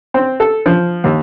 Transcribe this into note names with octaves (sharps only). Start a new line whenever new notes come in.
C4
A4
F3
D#2